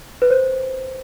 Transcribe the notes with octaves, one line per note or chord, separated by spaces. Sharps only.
B4
C5